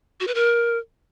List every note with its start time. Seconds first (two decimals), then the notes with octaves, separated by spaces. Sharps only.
0.20 F#4
0.27 B4
0.35 A#4